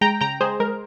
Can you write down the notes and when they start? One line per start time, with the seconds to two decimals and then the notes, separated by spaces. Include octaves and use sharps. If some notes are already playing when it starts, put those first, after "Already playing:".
0.01 G#3 G5 A#5
0.21 C#3 G5 A#5
0.40 G#3 G#4 C5
0.60 G#3 A#4